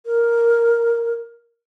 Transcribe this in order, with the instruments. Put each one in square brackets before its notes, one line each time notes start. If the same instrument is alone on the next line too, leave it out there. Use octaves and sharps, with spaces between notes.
[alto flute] A#4